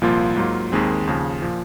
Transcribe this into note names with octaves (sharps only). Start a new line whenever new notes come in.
C2 A#2 F3 A#3 F4
G#2 F#3 A#3 F4
D#2 D#3 G#3 C4
D#2 C#3 F3
A#2 F3